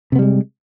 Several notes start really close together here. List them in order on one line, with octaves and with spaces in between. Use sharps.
C3 B3 G3 G#3